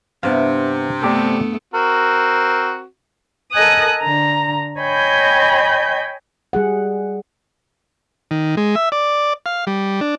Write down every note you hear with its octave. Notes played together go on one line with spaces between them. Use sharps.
G2 C3 B3 C4 E4 C5 F5
A3 B3 D4 G4 A4
C4 F#4 A#4
A4 A#4 D#5 G#5 D#6 F#6
D3 A#5
C#5 D#5 G5 G#5 B5 G6
G3 G#4 F#5
D#3
G#3
E5
D5
F5
G3
D4